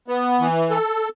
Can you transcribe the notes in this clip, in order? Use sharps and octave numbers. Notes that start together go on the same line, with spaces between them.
B3
E3
A4